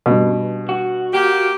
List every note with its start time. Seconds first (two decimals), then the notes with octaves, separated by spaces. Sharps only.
0.06 G2 B2
0.69 F#4
1.13 A#3 G4